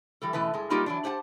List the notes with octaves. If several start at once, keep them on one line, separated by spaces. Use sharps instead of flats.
E3 G3 A4
F#2 B2 E3 A3 B4 A5
G2 G#3 A5
F#3 G3 A#3 D#4 F4 G4
E3 F#3 D4
G4 C5 F#5 G#5 A5